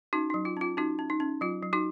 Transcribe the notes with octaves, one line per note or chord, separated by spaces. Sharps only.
C#4 D#4 F#4
F#3 D#4
F4
C#4 F4
C#4 D#4 F#4
C#4
D#4
C#4
F#3 F4
F#3
D#4 F#4